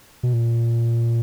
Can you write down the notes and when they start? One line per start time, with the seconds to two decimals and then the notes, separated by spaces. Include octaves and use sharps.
0.23 B2
0.33 A#2